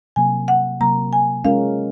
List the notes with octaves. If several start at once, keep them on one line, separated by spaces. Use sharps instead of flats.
C3 F#3 A#3 G#5
F#5
C3 F#3 A#3 A#5
G#5
G#3 C#4 F4 A#4 F5